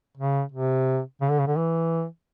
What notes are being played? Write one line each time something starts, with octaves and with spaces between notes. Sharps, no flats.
C#3
C3
C#3
D3
C#3
D3
E3